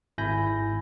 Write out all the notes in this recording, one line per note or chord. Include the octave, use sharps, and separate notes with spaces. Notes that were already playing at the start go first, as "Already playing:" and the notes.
G#1 E4 G#5 B5 G6 A#6